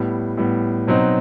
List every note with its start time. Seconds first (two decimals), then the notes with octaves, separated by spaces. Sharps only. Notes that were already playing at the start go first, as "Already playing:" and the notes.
Already playing: A2 G3 B3
0.37 A2 G3 B3
0.88 B2 F#3 C4 D#4